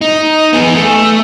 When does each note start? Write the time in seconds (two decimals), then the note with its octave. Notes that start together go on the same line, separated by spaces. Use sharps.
0.01 D#4
0.53 B3 G#4
0.76 A3